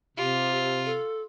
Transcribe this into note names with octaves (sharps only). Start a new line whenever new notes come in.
C3 F4 G4
A4